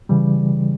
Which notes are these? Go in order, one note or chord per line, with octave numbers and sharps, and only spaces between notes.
C#3 E3 G3